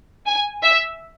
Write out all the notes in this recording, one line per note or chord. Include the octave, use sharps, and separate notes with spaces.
G#5
E5